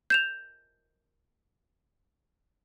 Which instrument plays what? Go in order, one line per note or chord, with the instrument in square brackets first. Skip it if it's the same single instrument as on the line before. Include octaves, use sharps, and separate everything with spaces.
[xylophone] G6 E7 F7